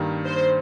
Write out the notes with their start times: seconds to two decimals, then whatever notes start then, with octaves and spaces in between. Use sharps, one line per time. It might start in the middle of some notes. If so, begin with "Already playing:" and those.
Already playing: G2 D#3 A#3
0.26 C5